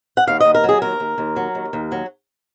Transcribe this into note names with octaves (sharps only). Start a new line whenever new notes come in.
F#5
D#2 F5
D#5
D#2
A#4
F#3 G#4
D#2 A#4
D#2
D#2
F#3
D#2
D#2
F#3